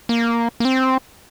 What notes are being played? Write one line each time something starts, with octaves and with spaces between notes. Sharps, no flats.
A#3
A#3
C4